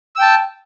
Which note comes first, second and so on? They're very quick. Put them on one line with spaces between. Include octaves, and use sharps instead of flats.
E6 G5 A5